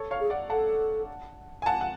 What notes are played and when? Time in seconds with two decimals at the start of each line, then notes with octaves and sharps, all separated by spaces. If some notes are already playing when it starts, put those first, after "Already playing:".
Already playing: A4 C#5
0.11 C#5 F5
0.20 G#4
0.30 D5 F#5
0.50 A4 F#5 A5
1.62 G#5
1.66 F#5 A5
1.81 F#5